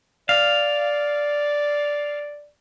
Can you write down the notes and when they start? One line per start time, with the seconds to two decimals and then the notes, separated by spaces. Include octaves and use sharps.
0.29 D5 F5